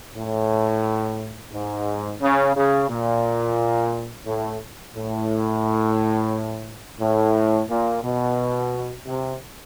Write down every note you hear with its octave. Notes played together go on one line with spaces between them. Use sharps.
A2
G#2
C#3
C#3
A#2
A2
A2
A2
A#2
B2
C3